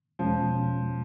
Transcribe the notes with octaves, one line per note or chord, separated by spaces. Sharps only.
E2 B2 F3 G#3 C#4